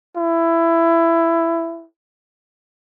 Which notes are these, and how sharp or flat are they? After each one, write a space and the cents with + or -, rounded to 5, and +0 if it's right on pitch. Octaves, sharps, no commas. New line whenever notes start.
E4 +15